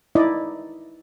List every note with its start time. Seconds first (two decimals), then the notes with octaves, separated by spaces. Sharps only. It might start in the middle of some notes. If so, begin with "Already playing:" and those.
0.15 D#4 E4 D5 D#5